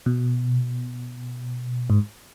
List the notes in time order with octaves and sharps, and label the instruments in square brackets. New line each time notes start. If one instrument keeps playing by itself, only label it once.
[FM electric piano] B2
G#2